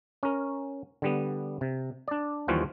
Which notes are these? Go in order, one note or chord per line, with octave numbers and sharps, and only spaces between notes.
C#4 A#4
D3 G3 B3
C3
D4 D5
D#2 E3 F3 G3 F4 F#4